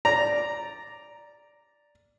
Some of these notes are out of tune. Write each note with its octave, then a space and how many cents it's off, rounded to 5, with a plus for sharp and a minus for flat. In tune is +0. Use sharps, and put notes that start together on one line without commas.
D5 +0 A#5 +0